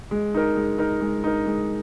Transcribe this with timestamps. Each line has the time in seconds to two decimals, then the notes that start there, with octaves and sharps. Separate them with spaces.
0.11 G#3
0.34 D#4 A#4
0.56 G#3
0.78 D#4 A#4
1.01 G#3
1.24 D#4 A#4
1.46 G#3